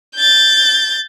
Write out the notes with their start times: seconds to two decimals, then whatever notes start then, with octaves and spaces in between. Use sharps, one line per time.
0.16 G6 A6